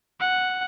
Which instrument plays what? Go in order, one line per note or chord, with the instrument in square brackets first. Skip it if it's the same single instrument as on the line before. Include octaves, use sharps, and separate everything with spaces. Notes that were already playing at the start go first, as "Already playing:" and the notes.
[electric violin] F#5